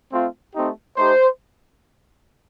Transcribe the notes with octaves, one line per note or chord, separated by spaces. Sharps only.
A3 C4 F4
A3 C4 D#4 G4
A3 D#4 G4 C5